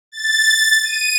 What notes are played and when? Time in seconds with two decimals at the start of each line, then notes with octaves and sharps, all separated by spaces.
0.12 A6
0.84 D#7